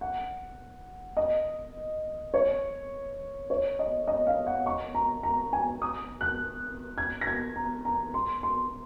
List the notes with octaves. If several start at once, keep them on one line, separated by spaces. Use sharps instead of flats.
F#5
D#5
C#5
C#5
D#5
D#5
F5
F#5
C#6
A#5
A#5
G#5
D#6
F#6
G#6
A#6
G#6
A#5
A#5
C6
C6